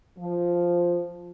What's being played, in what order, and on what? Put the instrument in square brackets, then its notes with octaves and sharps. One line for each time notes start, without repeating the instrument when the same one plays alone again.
[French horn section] F3